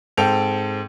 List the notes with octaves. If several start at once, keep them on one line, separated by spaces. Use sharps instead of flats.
G#2 C4 A4 G5 F7